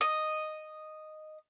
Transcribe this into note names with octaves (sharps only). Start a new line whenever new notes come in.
D#5